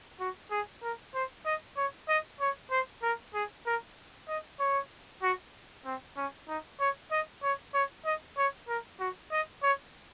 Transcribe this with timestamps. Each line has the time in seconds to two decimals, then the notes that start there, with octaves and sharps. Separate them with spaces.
0.20 F#4
0.51 G#4
0.82 A#4
1.14 C5
1.46 D#5
1.77 C#5
2.08 D#5
2.40 C#5
2.71 C5
3.03 A#4
3.34 G#4
3.66 A#4
4.28 D#5
4.60 C#5
5.23 F#4
5.85 C4
6.17 C#4
6.48 D#4
6.80 C#5
7.11 D#5
7.43 C#5
7.74 C#5
8.05 D#5
8.37 C#5
8.68 A#4
9.00 F#4
9.31 D#5
9.63 C#5